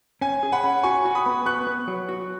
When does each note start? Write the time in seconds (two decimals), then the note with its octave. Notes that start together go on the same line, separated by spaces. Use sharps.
0.21 C#4 G#5
0.43 G#4
0.52 F#5 B5
0.64 C#4
0.83 F#4 G#5 C#6
1.05 F#4
1.15 B5 D#6
1.26 B3
1.46 B3 C#6 F#6
1.67 B3
1.88 F#3
2.09 F#4